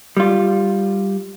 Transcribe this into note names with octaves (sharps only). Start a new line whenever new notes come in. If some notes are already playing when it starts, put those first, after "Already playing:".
G3 F4